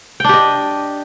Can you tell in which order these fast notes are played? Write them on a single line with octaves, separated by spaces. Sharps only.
G5 D4 G4 D#5